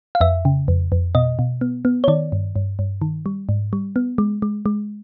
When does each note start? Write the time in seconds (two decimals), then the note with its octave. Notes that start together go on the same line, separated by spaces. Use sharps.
0.15 F5
0.21 F2 E5
0.45 C#3
0.68 F2
0.92 F2
1.15 B2 D#5
1.39 B2
1.61 B3
1.85 B3
2.04 C#5
2.08 D#3 D5
2.32 G2
2.56 G2
2.79 G2
3.02 D#3
3.26 G3
3.49 G#2
3.73 G3
3.96 B3
4.18 G#3
4.42 G#3
4.66 G#3